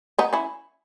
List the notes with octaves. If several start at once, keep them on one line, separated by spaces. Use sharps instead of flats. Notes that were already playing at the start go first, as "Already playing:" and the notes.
B3 D#4
C#4 E4